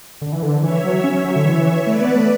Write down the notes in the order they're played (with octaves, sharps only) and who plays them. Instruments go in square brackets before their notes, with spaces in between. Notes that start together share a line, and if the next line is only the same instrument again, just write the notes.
[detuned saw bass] D3
E3
D3
[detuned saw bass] E3 [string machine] C#5 E5
[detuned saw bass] F#3
C#4
F#3
D3
E3
[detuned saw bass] A3 [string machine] B4 D5
[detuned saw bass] B3
A3